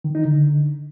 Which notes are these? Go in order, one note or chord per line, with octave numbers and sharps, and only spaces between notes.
D#3
D#4
D3